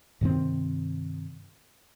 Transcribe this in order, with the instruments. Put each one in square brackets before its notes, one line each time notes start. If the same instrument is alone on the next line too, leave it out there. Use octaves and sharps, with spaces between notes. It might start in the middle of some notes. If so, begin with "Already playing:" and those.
[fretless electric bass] G2 C3 D#3 C4